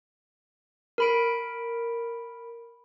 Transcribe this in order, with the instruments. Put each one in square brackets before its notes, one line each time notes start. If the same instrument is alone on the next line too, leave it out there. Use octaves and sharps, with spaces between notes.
[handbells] A#4 B5 D7